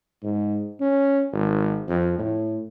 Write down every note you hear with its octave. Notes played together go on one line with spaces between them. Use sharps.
G#2
C#4
G#1
F2
A2